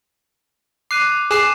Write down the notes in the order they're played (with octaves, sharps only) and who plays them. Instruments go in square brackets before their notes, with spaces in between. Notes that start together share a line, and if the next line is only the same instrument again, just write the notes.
[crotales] D6 F#6 D#7 [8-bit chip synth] C7
[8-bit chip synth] G#4 C7 [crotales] D6 F#6 E7